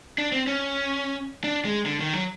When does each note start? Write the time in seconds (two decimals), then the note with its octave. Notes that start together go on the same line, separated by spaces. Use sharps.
0.18 D4
0.32 C4
0.47 C#4
1.44 D4
1.65 G#3
1.86 D3
2.00 D#3
2.13 F#3